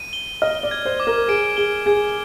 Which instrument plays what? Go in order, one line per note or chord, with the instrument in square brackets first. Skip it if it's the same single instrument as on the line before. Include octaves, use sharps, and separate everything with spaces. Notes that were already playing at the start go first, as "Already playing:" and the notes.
Already playing: [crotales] D#7
G7
[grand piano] D#5 [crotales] F6
[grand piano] D5
[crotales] G#6
[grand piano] C5
[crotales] D6
[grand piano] A#4
[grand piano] G#4 [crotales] D7
[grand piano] G#4 [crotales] G7
[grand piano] G#4 [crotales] G#6